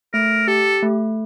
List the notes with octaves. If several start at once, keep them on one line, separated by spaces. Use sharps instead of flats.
A3 A#4
G4 A4
A3